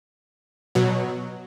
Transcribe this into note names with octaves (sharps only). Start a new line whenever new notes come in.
B2 F#3